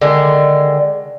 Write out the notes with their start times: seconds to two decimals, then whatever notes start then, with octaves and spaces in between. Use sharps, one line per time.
0.02 D3 D#3 G#3